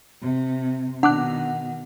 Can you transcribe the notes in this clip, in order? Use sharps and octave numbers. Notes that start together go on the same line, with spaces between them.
C3
B2 D#3 D4 F#5 D6 F#6